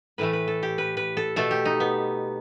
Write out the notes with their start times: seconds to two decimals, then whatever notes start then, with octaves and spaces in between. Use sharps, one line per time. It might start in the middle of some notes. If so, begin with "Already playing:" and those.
0.18 A2 E3 A3 B4
0.33 B4
0.48 A4
0.63 G4
0.78 B4
0.97 B4
1.17 A4
1.36 B2 A3 A4
1.51 G4
1.65 D#4
1.80 B3